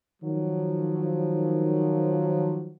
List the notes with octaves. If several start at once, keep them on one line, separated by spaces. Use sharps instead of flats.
D#3 F3 F#3